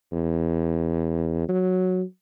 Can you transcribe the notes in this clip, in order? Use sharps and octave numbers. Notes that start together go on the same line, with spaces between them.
E2
F#3